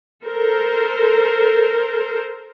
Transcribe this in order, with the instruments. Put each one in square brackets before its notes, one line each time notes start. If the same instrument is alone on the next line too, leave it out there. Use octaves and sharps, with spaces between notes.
[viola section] A4 A#4 C5